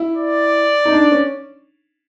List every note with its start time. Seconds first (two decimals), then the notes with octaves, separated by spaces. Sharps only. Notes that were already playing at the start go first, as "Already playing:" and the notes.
Already playing: E4
0.16 D5
0.85 D#4
0.92 D4
1.12 C#4